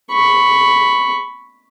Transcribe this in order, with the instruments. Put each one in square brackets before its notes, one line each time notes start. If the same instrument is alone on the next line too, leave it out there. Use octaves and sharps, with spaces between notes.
[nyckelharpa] B5 C#6